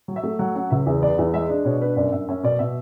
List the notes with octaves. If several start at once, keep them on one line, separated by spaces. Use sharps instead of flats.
F#3
E5
A3
F#3 F#5
C#4 F#5
C#2 E5
E2 E5
B3 D5
E2 E5
G#3 E5
D4
B2 C#5
D4 B4
F#2 D5
F#2 E5
C#4 E5
B2 D5
B2 E5